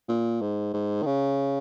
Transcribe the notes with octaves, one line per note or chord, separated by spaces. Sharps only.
A#2
G#2
G#2
D#3
C#3